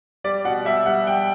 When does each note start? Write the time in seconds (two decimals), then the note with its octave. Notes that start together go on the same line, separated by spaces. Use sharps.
0.24 G3 D5
0.45 B2 F#5
0.65 G3 E5
0.86 G3 F#5
1.07 G3 G5